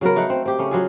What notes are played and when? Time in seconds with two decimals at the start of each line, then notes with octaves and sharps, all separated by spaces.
0.01 C#3 F#3 B3 A#4
0.16 A3 D#4 F5 F#5
0.30 C4
0.46 C4 G4
0.59 C#3 A3 C#4
0.71 F#3 F4 G#4